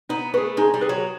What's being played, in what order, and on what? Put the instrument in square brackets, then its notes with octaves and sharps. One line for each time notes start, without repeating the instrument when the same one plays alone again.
[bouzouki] B3 [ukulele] D#4
[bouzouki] A3 [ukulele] G#4 B4
[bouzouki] G#3 [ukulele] D#4
[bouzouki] G3
[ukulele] G#4 B4
[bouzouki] F#3